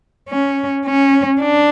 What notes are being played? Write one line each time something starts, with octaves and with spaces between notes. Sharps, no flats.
C#4
C#4
D4